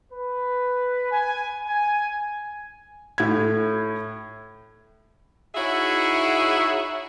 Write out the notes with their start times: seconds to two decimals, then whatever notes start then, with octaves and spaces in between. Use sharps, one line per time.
0.12 B4
1.12 G#5
1.67 G#5
3.18 A2 G#6
5.55 D#4 E4 F#4 G#4 C#5 E5